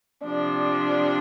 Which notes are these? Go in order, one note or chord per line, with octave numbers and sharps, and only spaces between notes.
C3 F3 D4 D5